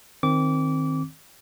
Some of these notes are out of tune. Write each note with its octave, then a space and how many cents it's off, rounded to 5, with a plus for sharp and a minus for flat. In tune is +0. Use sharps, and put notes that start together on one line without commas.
D#3 +0 C4 +10 D6 -25